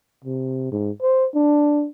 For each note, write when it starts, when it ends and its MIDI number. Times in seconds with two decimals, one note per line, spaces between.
0.24 0.69 48
0.72 0.91 44
1.02 1.26 72
1.34 1.87 62